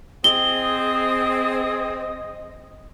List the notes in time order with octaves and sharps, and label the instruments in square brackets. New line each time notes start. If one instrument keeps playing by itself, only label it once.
[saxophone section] C4 [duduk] G#4 [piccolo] D#5 [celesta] G7